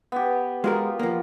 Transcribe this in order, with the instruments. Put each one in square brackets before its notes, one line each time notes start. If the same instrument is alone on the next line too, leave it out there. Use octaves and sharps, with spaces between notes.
[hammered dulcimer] B3 G4
[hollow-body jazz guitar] G#3 F#4 A#4 [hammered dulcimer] F4
[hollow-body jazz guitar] F3 A#3